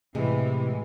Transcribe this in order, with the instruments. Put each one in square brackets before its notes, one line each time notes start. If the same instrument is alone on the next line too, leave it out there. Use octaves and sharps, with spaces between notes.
[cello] A2 E3 [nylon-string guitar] C3 [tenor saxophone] G#3